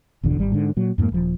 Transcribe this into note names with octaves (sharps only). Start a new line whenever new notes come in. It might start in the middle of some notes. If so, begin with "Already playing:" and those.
G1 E2 B2 D3
G#1 G3
G#2 D3
A#2 F#3
F2 G#2 G3 A#3
D#1 F3